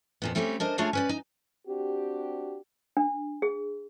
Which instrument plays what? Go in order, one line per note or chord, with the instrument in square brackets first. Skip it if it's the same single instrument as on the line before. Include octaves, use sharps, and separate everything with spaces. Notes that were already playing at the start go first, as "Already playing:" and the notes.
[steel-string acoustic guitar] F2 A#2 B3
G3 A3 C4 C#4 F#4 G4
D4 A#4 C5 D#5
A3 D4 F4 G#4 C#5 F5
C#4 B4 D5
D#4
[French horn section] C4 D4 F#4 G4
[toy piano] D4
G#4